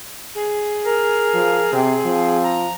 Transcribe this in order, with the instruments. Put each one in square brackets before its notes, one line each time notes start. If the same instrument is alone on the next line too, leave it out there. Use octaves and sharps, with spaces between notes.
[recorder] G#4
[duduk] A#4
[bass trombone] F3
[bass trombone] C3 [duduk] C4
[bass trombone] F3
[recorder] A#5